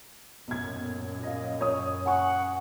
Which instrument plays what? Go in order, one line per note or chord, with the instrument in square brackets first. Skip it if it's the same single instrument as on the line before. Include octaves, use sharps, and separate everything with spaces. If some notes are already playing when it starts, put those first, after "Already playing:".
[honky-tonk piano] B1 G#6 [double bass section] F#2 A#2
[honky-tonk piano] D#5 F5
C#5 D#6
[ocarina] F#5 [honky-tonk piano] G#5 C#6